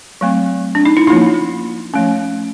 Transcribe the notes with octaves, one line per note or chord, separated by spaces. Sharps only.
F#3 A3 C4
D4
D#4
E4
F3 A#3 C#4 D#4 F4
F3 A3 C#4